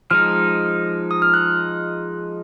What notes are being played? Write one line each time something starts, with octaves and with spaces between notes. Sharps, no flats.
F3 G#3 D#4 F6
D#6
F6
F#6